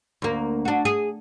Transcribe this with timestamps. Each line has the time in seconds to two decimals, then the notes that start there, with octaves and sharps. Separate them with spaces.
0.22 D2 A#3
0.65 D4 F#4
0.85 G#4